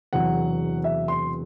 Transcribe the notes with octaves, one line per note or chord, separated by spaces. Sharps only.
E1 E2 C3 F#3 F#5
E5
C6